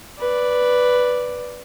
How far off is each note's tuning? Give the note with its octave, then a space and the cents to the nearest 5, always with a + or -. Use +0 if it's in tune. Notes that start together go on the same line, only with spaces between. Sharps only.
B4 +0 D5 +0